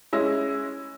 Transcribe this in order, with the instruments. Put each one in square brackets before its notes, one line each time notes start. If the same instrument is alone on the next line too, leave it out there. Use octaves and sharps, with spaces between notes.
[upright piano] G#3 C#4 E4 E6 A#6